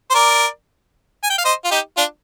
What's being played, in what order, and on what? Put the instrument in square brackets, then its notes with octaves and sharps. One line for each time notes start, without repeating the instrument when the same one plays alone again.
[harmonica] C5
A#4 D5
G#5
G5
F5
C5 D#5
F4
D#4 G4
D4 F4